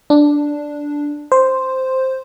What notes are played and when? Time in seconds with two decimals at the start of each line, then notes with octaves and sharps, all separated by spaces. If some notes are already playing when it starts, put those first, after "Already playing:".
0.10 D4
1.32 C5